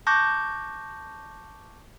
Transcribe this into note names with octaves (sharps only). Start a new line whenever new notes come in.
A5 C#6 D6 F#6 G6 A#6